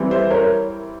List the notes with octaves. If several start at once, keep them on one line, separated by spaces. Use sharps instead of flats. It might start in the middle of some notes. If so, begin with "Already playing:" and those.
Already playing: E3 G3 C4
C5 E5
A#4 C#5